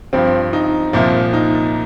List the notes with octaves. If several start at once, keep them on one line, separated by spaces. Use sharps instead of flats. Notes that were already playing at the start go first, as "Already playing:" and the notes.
G2 F3 C4
D#4
C2 A#2 F3
D#4